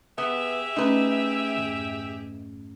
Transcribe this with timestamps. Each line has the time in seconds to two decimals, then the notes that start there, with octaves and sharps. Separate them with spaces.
0.18 B3 G4 G#4 E5
0.76 A3 C#4 D#4 B4
1.56 F2 G#2 D#3